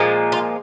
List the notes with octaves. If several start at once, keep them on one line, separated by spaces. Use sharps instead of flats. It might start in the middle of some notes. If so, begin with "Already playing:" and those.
Already playing: A#2 F3 G#3
F4